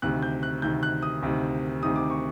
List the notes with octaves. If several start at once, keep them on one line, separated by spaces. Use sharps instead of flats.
D2 C3 D#3 F#6
G6
F#6
D2 C3 D#3 G6
F#6
D#6
D2 C3 D#3
D2 C3 D#3 D#6
D6
C#6